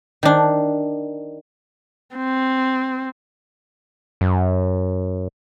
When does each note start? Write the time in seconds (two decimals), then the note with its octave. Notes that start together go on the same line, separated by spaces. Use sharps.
0.23 D#3 D4
2.16 C4
4.21 F#2